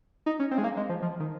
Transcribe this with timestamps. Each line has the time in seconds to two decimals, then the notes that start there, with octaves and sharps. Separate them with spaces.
0.26 D#4
0.40 C#4
0.51 C4
0.58 G#3
0.64 A#3
0.77 G#3
0.89 F3
1.02 F3
1.20 D#3